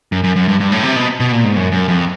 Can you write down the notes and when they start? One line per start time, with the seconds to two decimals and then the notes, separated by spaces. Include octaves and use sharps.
0.12 F#2
0.24 F#2
0.36 F#2
0.48 G2
0.60 G2
0.72 A2
0.84 C3
0.96 B2
1.20 B2
1.32 A#2
1.44 G#2
1.56 F#2
1.72 F#2
1.88 F2